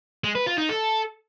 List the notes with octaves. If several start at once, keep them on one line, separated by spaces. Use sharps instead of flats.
G#3
B4
F4
D#4
A4